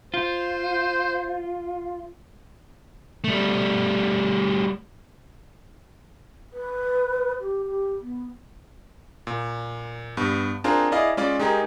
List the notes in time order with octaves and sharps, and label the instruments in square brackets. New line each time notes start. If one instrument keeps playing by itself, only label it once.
[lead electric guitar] F4 [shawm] C5
[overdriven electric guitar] G3 A3
[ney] B4
G4
G4
B3
[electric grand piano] A#2
G2 B3
C4 D4 F4 G#4 A#4 C5
E4 G#4 D5 D#5 F5
G#3 C#4 F4 D5 D6
G#3 D#4 G4 G#4 A#4